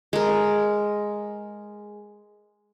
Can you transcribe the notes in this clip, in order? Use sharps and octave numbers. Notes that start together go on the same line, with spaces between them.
G#3 A#4